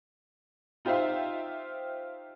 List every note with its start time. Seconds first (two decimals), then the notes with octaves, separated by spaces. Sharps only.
0.85 D#4 F4 G4 C5 E5 F5